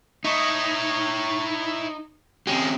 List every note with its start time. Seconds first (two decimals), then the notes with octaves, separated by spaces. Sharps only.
0.25 D#4 E4 C#5
2.47 F3 G#3 C4 C#4 G4